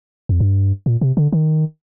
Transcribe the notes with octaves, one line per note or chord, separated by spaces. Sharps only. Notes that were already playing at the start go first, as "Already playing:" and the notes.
F2
G2
A#2
C3
D3
D#3